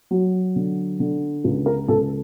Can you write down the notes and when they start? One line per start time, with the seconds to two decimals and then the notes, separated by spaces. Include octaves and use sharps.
0.11 F#3
0.56 D3
1.00 D3
1.44 C#2
1.66 A#4
1.88 C#2 A4